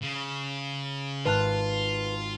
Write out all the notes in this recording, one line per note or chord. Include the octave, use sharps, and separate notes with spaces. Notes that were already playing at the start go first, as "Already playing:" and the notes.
C#3
G#1 F4 B4 A5 F#6